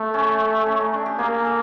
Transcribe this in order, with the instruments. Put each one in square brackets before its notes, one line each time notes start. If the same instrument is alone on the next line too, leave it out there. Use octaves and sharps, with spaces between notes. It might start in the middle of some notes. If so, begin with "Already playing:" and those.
Already playing: [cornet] A3
[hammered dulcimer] C#4
C#4
D#4
D4
G4
[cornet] A#3 [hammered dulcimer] G#4
[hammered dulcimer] A4